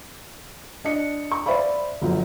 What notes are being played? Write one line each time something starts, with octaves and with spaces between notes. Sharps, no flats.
D4 D#5 C#7
C#6
C5 D5 E5 F5 B5
G1 F3 F#3